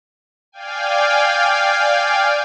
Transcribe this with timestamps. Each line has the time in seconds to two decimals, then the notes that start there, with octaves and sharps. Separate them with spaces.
0.52 D5 F5 G5 G#5